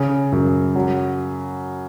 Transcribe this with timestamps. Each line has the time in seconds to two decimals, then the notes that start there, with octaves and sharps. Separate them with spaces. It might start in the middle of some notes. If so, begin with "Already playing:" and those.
Already playing: C#3
0.32 F#2
0.76 F#3